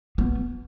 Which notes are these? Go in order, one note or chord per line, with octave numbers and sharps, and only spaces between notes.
B3